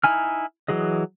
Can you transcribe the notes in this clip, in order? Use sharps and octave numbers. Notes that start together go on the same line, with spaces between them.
D#4 E4 G#5 F6
E3 F#3 G#4 D#5